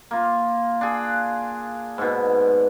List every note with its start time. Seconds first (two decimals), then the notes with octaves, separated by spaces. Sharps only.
0.11 A#3 F4
0.81 D4 G#4
1.98 G#2 B2